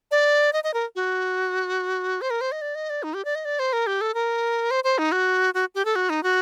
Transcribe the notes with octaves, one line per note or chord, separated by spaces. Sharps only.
D5
D#5
D#5
A#4
F#4
C5
A#4
C5
D#5
D5
D#5
D5
D#4
G4
D5
D#5
D5
C5
A#4
G4
A4
A#4
C5
C5
D#4
F#4
F#4
G4
A4
F#4
D#4
F#4